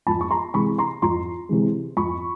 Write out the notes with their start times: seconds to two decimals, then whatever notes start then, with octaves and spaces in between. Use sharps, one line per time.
0.07 F2 A5 B5
0.21 C#6
0.31 A#5 C6
0.54 C3 E3 G#3 B5 C#6
0.78 A#5 C6
1.02 F2 A#5 C6
1.49 C3 E3 G#3
1.97 F2 B5 C#6